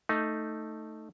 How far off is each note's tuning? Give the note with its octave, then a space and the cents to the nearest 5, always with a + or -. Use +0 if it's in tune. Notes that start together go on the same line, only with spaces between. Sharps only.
A3 +5 D#4 +0